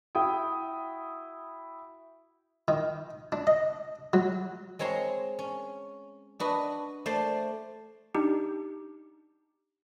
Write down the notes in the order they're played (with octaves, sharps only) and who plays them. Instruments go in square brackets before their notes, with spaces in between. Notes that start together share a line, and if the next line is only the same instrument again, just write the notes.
[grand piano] E4 F#4 G5 D#6
[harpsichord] D#3
D4
D#5
F#3
[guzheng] G#3 C4 C#5 A#5 C6
C#4
D4 F#4 B4 D#5
A3 C5 D5 A5 C6
[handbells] D4 D#4 G4